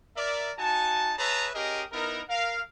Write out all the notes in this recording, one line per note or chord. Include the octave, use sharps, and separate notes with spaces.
A#4 D5 E5
D#4 F#4 G#5 A5
G#4 B4 C#5 E5 A5 A#5
C#4 G4 G#4 A#4 D#5
B3 D#4 E4 A#4
A#4 F5